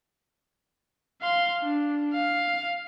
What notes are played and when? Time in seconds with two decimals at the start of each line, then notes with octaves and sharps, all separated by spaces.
1.22 F5 C6
1.62 D4
2.14 F5